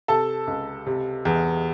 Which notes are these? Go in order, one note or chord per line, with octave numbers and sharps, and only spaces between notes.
C3 A4 A5
C#2
C3
E2